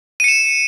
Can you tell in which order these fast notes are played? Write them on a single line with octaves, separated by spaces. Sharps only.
D#7 C#7 E7